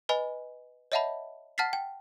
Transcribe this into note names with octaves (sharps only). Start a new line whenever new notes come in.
B4 D#5 G#5 B5
C#5 D#5 E5 F#5 A5 B5
F#5 A5 F6 A6 B6 C7
G5